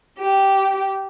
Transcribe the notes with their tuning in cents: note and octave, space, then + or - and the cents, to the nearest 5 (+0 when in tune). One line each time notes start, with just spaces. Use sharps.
G4 -10